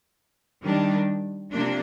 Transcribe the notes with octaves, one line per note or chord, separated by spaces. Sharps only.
D#3 G3 D4
C3 F3 A#3 D4